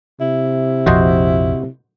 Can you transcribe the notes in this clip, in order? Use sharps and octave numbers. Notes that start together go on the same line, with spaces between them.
C3 E4
A#1 F2 F3 F#4 C5 D#5